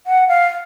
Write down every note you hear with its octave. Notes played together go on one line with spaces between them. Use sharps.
F#5
F5